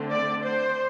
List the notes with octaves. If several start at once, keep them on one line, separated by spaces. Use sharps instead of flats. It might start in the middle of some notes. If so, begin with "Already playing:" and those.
Already playing: D3 A3 C4
D5
C5